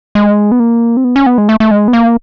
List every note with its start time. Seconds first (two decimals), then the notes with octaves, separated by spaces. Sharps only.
0.15 G#3
0.52 B3
0.60 A#3
0.97 C4
1.04 B3
1.16 C#4
1.26 B3
1.38 G#3
1.49 A3
1.60 A3
1.71 G#3
1.88 B3
1.93 A#3